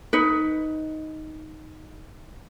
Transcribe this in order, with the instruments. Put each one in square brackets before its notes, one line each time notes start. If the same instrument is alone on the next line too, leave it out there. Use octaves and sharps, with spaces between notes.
[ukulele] D#4 B4